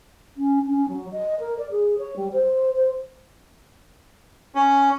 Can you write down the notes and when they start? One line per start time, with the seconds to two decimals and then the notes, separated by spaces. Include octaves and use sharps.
0.37 C#4
0.69 C#4
0.89 F#3
1.12 D#5
1.40 A#4
1.59 D5
1.71 G#4
1.98 C#5
2.16 G3
2.33 C5
2.76 C5
4.55 C#4